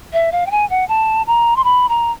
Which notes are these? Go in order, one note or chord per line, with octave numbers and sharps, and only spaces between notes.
E5
F5
G5
G#5
F#5
A5
A#5
C6
B5
A#5